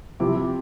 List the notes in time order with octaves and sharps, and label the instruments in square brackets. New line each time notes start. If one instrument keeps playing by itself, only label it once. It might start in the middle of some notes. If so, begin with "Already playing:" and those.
[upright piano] C3 F3 C4 E4 D6